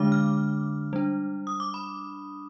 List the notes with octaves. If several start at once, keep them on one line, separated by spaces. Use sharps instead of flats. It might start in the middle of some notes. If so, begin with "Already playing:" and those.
Already playing: D3 G#3 D4 D6
F6
G3 D4
D#6
D6
B5